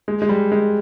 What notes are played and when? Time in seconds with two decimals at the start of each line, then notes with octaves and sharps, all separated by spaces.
0.08 G#3
0.22 G#3
0.29 G3
0.52 G#3